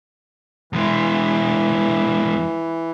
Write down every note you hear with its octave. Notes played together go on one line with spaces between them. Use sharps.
E2 E3 G#3